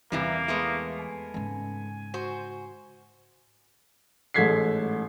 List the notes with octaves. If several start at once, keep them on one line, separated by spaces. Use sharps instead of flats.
E2 C3 E3 G3 A#3
G#3 A3 B3
G#5
G#2 C#3
F#4 C5
A1 G#2 A4 G#6 B6 C7